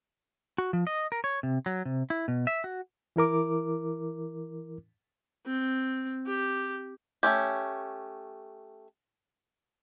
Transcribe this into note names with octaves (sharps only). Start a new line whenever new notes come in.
F#4
F3
D#5
A#4
C#5
C3
F#3
C3
E4
B2
E5
F#4
E3 E4 A#4 D6
C4
G4
A3 C#4 G4